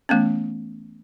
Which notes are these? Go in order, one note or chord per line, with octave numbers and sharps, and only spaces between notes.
E3 A3 B3 C#4